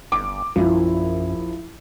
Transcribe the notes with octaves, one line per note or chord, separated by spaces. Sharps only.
G1 D6
A#1 F#2 F3 E4